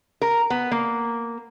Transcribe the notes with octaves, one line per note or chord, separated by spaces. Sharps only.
A#4
B3
A#3